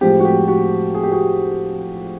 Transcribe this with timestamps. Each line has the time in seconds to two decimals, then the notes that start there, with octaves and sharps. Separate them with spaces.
0.01 A2 F3 G#3 C4 G4
0.20 F#4
0.25 G4
0.48 F#4
0.95 G#4
1.03 G4
1.11 F#4 G#4